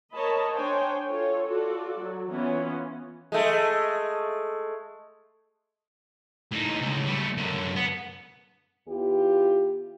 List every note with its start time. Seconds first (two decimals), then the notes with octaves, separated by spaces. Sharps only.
0.16 A#4 C#5 D#5 A5 B5
0.55 D4 C5 C#5 G5 G#5
1.05 F4 A4 C#5
1.47 F4 F#4 A4 D5
1.98 F#3
2.29 E3 B3 C#4 F4
3.32 G#3 A3
6.52 A2 D#4
6.82 C#2 A2
7.07 G3 A3
7.37 F#2 D3
7.76 B3
8.88 E2 E4 F4 G4